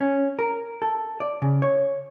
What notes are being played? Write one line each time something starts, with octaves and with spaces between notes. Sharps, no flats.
C#4
A#4
A4
D5
C#3
C#5